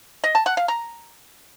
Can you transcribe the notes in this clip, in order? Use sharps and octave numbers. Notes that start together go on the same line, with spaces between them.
D#5
A5
F#5
F5
A#5